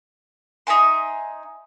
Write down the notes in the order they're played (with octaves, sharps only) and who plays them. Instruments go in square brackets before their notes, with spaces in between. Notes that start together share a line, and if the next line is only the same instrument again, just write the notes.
[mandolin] D#4 E5 G#5 C6